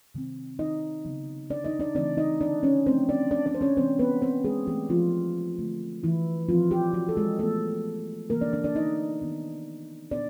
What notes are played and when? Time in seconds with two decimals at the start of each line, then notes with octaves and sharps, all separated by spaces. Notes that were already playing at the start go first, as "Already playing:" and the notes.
0.15 C3 D#3 G3 C4
0.59 D#4 D#5
1.05 C#3 F#3 B3
1.50 D4 D5
1.65 D#4 D#5
1.80 D4 D5
1.95 C#3 E3 A3 C4 D4 D5
2.17 D#4 D#5
2.41 D4 D5
2.63 C#4 C#5
2.86 C#3 F3 A3 C4 C5
3.09 D4 D5
3.31 D4 D5
3.46 D4 D5
3.54 C5
3.61 C#4 C#5
3.76 C3 E3 G#3 B3 C4 C5
3.99 B3 B4
4.22 C4 C5
4.44 G#3 G#4
4.67 E3 G3 A3 C4 G4
4.89 F3 F4
5.58 D3 F#3 A3
6.03 E3 E4
6.48 A#2 F3 G3 C4 F4
6.71 G3 G4
6.94 F#3 F#4
7.09 A4
7.17 G#3 G#4
7.39 E3 G#3 A3 B3 A4
8.30 C3 E3 G3 A#3 A#4
8.41 D4 D5
8.53 D4 D5
8.64 D4 D5
8.76 D#4 D#5
9.21 D#3 G3 B3
10.11 A#2 G3 B3 D4 D5